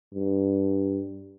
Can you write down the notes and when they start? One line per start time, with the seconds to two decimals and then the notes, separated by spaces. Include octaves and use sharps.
0.14 G2